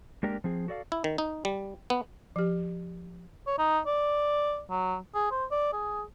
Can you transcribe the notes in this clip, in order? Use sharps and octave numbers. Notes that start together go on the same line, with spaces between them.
G#3 A#3 D4 G4 A#4
F3 C4 G#4
F#4 A4 D5 D#5 F5
E4
D#3
D#4
G3
B3
F3 G4
C#5
D#4
D5
F#3
G#4
C5
D5
G#4